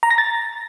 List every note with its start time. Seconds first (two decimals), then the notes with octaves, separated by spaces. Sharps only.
0.03 A#5
0.11 A#6
0.18 A6